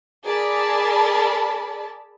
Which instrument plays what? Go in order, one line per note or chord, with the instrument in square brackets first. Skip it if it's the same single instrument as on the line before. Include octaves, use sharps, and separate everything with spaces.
[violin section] G#4 A#4 D5 A5 B5